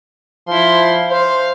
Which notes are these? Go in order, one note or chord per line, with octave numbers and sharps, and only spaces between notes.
F3 E4 C6
C5 F5